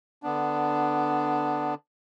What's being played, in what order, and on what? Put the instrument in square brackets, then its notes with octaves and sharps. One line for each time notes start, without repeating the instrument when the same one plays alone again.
[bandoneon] D3 B3 D4